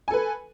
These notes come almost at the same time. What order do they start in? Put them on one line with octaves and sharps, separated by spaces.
G#5 A4 B4